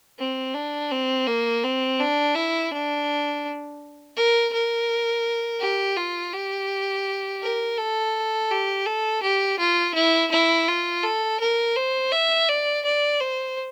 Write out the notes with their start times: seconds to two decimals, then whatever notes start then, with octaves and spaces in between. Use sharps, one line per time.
0.18 C4
0.54 D4
0.91 C4
1.27 A#3
1.63 C4
1.99 D4
2.35 E4
2.71 D4
4.16 A#4
4.53 A#4
5.60 G4
5.97 F4
6.33 G4
7.42 A#4
7.78 A4
8.51 G4
8.86 A4
9.22 G4
9.59 F4
9.94 E4
10.31 E4
10.68 F4
11.03 A4
11.40 A#4
11.75 C5
12.12 E5
12.49 D5
12.85 D5
13.21 C5